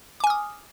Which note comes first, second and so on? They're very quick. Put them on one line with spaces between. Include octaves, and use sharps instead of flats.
D6 G#5 F6 D#6